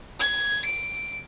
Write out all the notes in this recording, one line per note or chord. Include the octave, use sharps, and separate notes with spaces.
G#6
D7